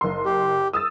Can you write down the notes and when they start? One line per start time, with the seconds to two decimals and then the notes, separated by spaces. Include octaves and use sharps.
0.01 F#1 C6
0.25 G4
0.73 D#6 E6 A6